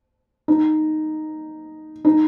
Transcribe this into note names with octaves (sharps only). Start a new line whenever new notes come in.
D#4
D#4